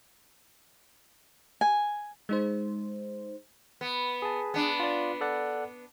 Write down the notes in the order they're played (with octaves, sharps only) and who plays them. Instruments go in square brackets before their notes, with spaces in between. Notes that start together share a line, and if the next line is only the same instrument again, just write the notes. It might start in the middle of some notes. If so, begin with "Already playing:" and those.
[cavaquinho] G#5
[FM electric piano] G#3 D#4 C5
[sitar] B3
[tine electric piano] G#4 A5
[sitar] B3 D4
[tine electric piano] F4 D5
A4 D5 F#5